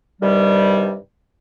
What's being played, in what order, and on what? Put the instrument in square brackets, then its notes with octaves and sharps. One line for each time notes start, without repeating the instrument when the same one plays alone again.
[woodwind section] G2 C3 D#3 G3